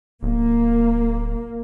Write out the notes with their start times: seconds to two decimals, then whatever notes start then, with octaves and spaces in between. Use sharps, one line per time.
0.23 D1 A#3